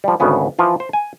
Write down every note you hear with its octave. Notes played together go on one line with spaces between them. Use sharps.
F3 G3
G#1 D2 C#3 B3 C#4
E3 F3 F4
C5
G#5